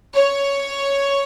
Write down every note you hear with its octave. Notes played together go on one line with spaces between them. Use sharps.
C#5